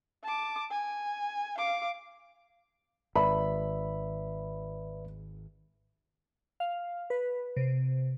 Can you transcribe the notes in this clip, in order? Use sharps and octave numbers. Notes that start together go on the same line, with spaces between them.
A5 D6
G#5
F5 D6
G#1 B4 D5 E5 B5
F5
B4
C3